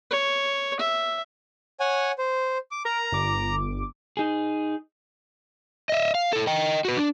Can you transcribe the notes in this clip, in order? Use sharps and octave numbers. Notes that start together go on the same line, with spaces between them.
C#5
E5
C#5 F#5 G#5
C5
D6
A#4 A#5
G1 D6
D#4 G#4
D#5 E5
F5
E4 A4
D#5 G5
F#4 B4
D4